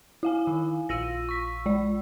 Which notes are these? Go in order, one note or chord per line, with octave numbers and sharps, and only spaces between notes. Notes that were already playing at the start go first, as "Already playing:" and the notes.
E4 F5 G#5
D#3
A#1 F4 E6 A#6 D#7
C#6 B6
G#3 D5